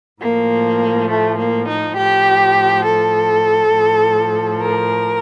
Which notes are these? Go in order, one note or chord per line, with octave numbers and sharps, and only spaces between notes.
A2 F3 A#3
A3
A#3
D#4
A2 F3 G4
A4
A2 F3
A#4